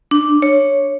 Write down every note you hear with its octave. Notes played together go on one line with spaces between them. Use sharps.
D4
C#5